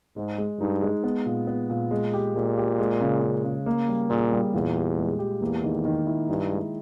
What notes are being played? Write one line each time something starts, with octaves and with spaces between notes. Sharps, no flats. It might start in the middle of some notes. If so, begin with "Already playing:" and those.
G#2 G#3
G#3
G2 D#4
G#3
B3
A#2
B3
A#2
G#3
G4
A#2 G#3
G4
G#3
C#3
C#3
C#3
A#3
G3
A#2 G#4
G3
E2 A#2
G4
G#3
G4
E2 A#3
D#3
D#3
E4
G2 D#4
G#3